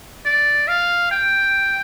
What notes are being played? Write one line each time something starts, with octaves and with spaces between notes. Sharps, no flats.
D5
F5
G5